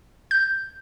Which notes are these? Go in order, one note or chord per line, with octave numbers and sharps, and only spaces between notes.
G6